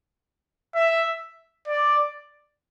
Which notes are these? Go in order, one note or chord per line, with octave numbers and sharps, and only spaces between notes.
E5
D5